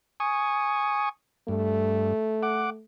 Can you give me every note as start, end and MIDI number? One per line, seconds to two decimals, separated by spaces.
0.20 1.09 80
0.20 1.09 85
0.20 1.09 87
1.48 2.13 43
1.48 2.84 57
2.43 2.70 78
2.43 2.70 86